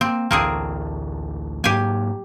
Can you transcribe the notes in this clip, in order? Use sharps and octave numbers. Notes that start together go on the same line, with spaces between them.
A#3 C4
A1 D2 A#3 C4 G#4
G#2 F#3 A#3 G4 G#5